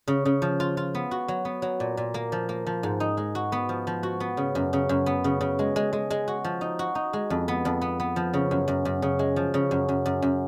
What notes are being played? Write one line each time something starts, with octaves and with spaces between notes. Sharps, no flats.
C#3
C#3
F3
F4
F4
B3
F#4
F#3
B3
F#3
A#2
A#2
A#3
F3
A#3
F3
G#2
D#4
G#3
F#4
B3
F3
F3
F#4
B3
C#3
F#2
C#3
F#2
B3
C#3
C#3
G#3
G#3
G#3
G#3
F#4
F3
D#4
F#4
D#4
G#3
F2
B3
F2
B3
B3
F3
C#3
F#2
F#2
F#2
C#3
G#3
F3
C#3
F#2
F#2
F#2
F#2